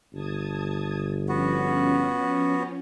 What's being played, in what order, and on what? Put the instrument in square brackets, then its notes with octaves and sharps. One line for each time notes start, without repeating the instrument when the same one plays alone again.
[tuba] G1 [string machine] A5 D#6 G#6
[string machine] F3 C#4 [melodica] B3 F#4